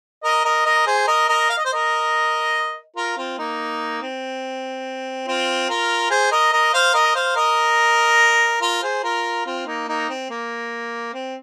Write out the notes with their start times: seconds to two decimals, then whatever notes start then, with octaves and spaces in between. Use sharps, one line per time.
0.24 A#4 D#5
0.45 A#4 D#5
0.66 A#4 D#5
0.86 G#4 C5
1.07 A#4 D#5
1.28 A#4 D#5
1.50 F5
1.58 D#5
1.65 C5
1.73 A#4 D#5
2.96 F4 A#4
3.17 C4 F4
3.38 A#3 D#4
4.02 C4
5.27 C4 F4
5.69 F4 A#4
6.10 G#4 C5
6.32 A#4 D#5
6.52 A#4 D#5
6.74 C5 F5
6.94 A#4 D#5
7.15 C5 F5
7.36 A#4 D#5
8.62 F4 A#4
8.83 G#4 C5
9.04 F4 A#4
9.46 C4 F4
9.67 A#3 D#4
9.88 A#3 D#4
10.09 C4
10.30 A#3
11.13 C4